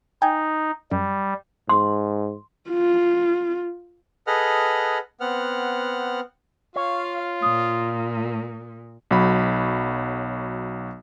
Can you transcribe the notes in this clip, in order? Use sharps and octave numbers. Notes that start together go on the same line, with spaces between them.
D#4 G5 G#5
F#2 G3
G#2 C6
F4
G#4 A4 B4 D#5 F#5 F6
B3 C4 F#5 F6
F4 C#5 F5
A#2 D#6
B1 F#3 B5